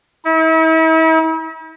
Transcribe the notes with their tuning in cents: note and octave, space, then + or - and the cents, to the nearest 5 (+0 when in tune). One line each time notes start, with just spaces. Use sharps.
E4 -40